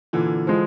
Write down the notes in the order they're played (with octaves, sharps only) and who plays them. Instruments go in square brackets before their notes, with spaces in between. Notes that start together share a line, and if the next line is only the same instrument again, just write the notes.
[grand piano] A#2 [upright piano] D3 E3
[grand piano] F3 G#3